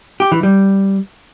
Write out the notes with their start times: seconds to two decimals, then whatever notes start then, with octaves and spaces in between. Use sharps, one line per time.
0.20 G4
0.32 E3
0.43 G3